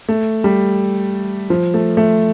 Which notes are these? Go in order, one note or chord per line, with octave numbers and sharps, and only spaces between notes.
A3
G3
F3
A3
A3